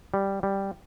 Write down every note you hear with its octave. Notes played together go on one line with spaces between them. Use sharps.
G3
G3